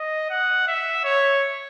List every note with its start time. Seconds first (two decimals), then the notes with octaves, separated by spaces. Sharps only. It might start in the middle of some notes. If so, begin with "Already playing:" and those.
Already playing: D#5
0.30 F#5
0.67 E5
1.04 C#5